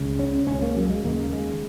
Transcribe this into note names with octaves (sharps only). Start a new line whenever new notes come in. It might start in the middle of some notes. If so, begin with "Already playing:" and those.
Already playing: C#2 C#3
C#4
C#2 C#3 C#4
A#3
F#3
G#3
D#2 C#3 A#3
G#3